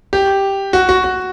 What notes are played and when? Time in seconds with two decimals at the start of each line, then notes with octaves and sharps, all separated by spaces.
0.13 G4
0.73 F#4
0.89 F#4
1.04 F#4